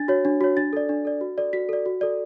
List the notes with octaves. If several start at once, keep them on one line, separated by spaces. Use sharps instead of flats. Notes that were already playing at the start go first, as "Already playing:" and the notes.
Already playing: D4 A6
F#4 C#5
D4
F#4 C#5
D4 A6
A4 D5
D4
A4 D5
F#4
A4 D5
F#4 B6
A4 D5
F#4
A4 D5